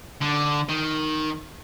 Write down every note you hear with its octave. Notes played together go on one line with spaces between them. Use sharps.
D3
D#3